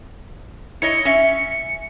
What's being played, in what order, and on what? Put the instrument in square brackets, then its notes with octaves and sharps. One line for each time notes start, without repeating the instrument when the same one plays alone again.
[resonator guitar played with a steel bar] E4 C#5 D#5 [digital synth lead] C#7
[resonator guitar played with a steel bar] C#4 E5